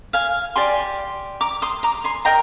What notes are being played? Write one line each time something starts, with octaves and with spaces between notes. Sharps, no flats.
F5 G#5
G4 D5 G#5 C6
A#5 D6
C6 D#6
A#5 D6
G#5 C6
A#4 D#5 G5 A#5